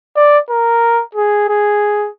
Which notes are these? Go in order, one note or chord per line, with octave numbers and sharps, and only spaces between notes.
D5
A#4
G#4
G#4